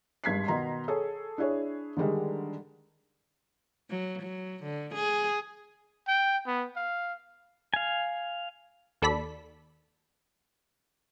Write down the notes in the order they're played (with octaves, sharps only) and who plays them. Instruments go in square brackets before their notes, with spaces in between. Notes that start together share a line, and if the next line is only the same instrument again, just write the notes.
[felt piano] G#1 G2 G#6 B6 C7
B2 D#3 A#5 C6
G#4 A4 C#5
D4 E4 G#4 C#5
D3 D#3 G3 G#3
[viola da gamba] F#3
F#3
D3
G#4
[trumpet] G5
B3
F5
[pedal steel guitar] F5 G#5
[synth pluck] D#2 A4 D5 B5 B6